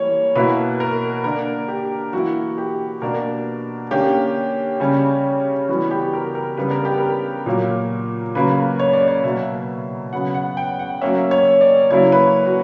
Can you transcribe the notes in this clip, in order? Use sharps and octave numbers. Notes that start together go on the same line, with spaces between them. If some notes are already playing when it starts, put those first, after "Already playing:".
Already playing: E3 G3 A#3 C#5
B2 A#3 E4 B4
A#4
D3 A#3 D4 A#4
G4
E3 A#3 E4 F#4
G4
B2 A#3 D4 A#4
D3 A#3 C#4 G4
C#3 G3 C#4
E3 G3 B3 F#4
G4
A#4
A#4
C#3 G3 B3 D4 B4
A#4
G4
A#4
A#2 F#3 A#3
C#3 F#3 A#3 B4
C#5
D5
C#5
B2 F#3 A#3 E5
C#3 F#3 B3 F#5
F#5
G5
F#5
F#3 A#3 C#4 E5
C#5
D5
C#3 F#3 A#3 C#4 E4 C#5
B4
F#4